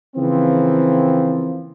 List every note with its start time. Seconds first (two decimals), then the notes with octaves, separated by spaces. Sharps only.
0.16 C#3 E3 F3 A#3 C4